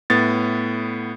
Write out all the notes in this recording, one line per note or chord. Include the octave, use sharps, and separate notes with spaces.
A2 B3 A6